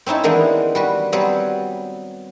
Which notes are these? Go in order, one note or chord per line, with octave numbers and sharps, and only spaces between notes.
C4 C#4 D#4 E4 A5
D#3 E3 G#3 A#3 B3 D4
G3 F#4 B4
F#3 G3 B3 C4 F#4